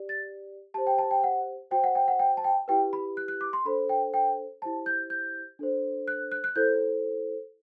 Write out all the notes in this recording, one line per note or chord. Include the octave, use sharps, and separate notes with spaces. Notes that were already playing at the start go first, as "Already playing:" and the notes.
Already playing: G4 D5
A6
G4 C5 A5
G5
A5
G5
F#5
F#4 C5 G5
F#5
G5
F#5
G5
A5
G5
E4 G4 B4 G5
B5
F#6
F#6
D6
C6
D4 A4 C5 B5
G5
G5
E4 G4 C5 A5
G6
G6
D4 A4 C5
F#6
F#6
F#6
E4 A4 C5 G6